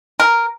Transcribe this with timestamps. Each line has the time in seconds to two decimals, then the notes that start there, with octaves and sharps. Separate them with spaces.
0.20 A#4